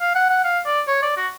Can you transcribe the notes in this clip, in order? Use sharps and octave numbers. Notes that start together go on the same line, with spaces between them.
F5
F#5
F#5
F5
D5
C#5
D5
F#4